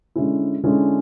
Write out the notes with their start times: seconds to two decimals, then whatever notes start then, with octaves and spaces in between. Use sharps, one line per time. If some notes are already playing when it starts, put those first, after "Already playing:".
0.15 D3 G#3 C#4 E4
0.63 D3 G#3 C#4 E4